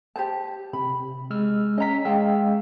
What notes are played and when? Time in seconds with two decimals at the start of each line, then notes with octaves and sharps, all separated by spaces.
0.16 G4 C5 A5
0.73 C3 B5
1.30 G#3 E6 F6
1.78 C#4 D#5 A#5 B6
2.05 G#3 F5 G5 E6